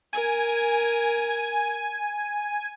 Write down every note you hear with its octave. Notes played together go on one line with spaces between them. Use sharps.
A#4 G#5